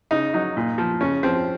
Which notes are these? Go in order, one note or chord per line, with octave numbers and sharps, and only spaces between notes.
C#3 D#4
F#3 D#4
A#2
F3
C#3 C#4
F3 C4